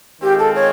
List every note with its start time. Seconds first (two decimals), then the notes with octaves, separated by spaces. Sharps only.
0.22 D#3 G#3 C4 F4 G4
0.39 A4
0.55 C#5